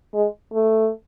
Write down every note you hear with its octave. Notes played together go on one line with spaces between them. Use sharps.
G#3
A3